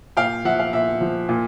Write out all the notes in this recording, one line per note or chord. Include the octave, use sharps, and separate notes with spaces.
A#2 F5 G5
F3 E5 F#5
F5
A#2 E5
F3
A#2